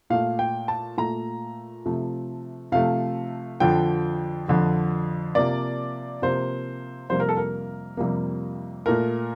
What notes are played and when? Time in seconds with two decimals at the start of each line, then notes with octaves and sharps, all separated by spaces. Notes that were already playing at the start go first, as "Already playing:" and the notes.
0.10 A#2 A3 F5
0.39 G5
0.68 A5
0.97 A#2 A3 A#5
1.86 C3 F3 A3
2.72 C3 F3 A3 F5
3.60 F2 D3 F3 G5
4.48 F2 D3 F3
5.35 C3 F3 A#3 D5
6.22 C3 F3 A#3 C5
7.10 F2 C3 G3 A#3 C5
7.20 A#4
7.29 A4
7.37 A#4
7.97 F2 C3 G3 A#3
8.86 A#2 A3 A#4